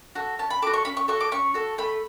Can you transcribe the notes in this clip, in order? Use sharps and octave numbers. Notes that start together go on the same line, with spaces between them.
F#4 A4
C#4 A5
B5
F#4 A4 D6
C#6
C#4 B5
C#6
F#4 A4 C#6
D6
C#4 C#6
F#4 A4
A3 B5